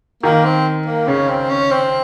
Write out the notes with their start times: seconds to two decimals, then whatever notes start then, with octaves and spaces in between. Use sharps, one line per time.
0.23 D#3 A#3
0.44 C4
0.86 A#3
1.07 C#3 C#4
1.28 C4
1.49 C#4
1.71 C4